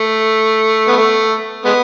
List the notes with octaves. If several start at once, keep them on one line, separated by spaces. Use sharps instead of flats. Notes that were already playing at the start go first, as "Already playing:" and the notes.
Already playing: A3
B3
A3
G#3 B3